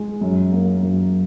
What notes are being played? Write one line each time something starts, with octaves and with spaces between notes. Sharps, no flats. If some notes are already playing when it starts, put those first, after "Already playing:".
Already playing: G#3
F#2
A#3
F#2